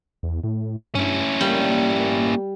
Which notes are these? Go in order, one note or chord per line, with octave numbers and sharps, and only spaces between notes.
E2
A2
G2 C#4 E4
G3 A#3